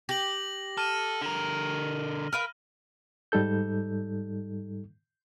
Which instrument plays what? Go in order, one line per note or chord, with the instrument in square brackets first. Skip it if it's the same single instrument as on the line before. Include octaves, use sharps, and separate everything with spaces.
[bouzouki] G4 [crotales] A#6 F#7
[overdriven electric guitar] A4 [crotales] F6 D#7
[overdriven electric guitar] D3 A#4
[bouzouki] A#4 B4 F5
[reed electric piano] G#2 G3 D#4 A4 G6